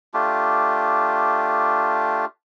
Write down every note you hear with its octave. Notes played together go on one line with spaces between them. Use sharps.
A3 D4 F4 G4